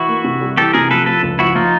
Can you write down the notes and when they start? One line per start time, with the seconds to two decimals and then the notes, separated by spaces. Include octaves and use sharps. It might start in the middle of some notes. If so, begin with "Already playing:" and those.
Already playing: E3 E4 F#4
0.08 A#3
0.24 C3
0.41 G3
0.57 E3 G4 A4
0.73 C3 G#4 A#4
0.90 F3 A4 B4
1.06 F3 A4 B4
1.23 C#2
1.39 F3 E4 F#4
1.55 F3 D#4 F4